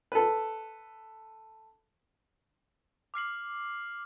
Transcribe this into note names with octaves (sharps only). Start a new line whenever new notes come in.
A4 B4
D6 F6 C7 F#7